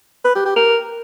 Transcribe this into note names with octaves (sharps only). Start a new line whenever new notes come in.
B4
G4
G4
A#4